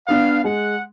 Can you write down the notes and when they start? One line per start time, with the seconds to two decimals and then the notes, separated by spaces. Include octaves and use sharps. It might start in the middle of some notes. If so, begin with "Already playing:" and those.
0.08 B3 D4 F5
0.44 G#3 F#5